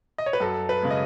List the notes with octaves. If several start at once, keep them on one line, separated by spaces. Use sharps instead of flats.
D#5
C#5
B4
F#2 A4
B4
C#3 G#3
D#5